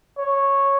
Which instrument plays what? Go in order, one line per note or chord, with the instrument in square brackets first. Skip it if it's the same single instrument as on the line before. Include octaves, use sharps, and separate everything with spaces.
[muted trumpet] C#5